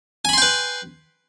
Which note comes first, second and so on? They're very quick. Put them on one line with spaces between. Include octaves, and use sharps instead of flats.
G#5 B5 C6 G5 B4